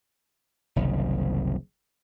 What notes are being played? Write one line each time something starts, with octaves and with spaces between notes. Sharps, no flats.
F#1 C2 D#3